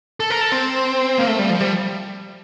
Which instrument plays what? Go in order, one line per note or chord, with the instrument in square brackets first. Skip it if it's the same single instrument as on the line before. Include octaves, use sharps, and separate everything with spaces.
[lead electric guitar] A4
A#4
A4
C4
A#3
A3
G3
F3
G3